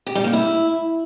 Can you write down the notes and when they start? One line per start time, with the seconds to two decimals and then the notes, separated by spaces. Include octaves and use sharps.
0.06 G4
0.15 G3
0.24 A#3
0.33 E4